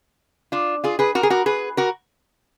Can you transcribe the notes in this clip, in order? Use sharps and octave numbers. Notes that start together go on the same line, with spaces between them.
D4 F4
F4 G#4
G#4 B4
F#4 A#4
G#4
F#4 A#4
G#4 B4
F#4 A#4